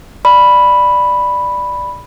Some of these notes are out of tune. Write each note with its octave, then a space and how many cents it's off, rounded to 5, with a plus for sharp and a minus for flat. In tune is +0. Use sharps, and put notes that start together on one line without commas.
D5 +10 B5 +0